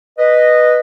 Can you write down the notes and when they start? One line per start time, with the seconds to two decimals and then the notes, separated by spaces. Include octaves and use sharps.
0.19 B4 D#5